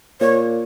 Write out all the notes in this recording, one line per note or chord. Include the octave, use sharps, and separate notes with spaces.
A#2 C#5